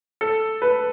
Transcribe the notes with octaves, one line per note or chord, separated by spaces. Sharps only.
A4
B4